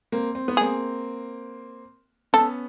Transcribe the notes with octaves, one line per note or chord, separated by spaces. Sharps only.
A#3 C4
C4
B3
A#3 C4 G#4
B3 C#4 A4